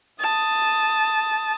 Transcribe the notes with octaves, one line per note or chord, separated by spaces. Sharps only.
A5 D#6